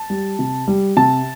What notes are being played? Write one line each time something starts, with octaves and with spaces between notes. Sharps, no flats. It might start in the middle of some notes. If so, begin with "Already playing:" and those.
Already playing: A5
G3
C3
G3
C3 A5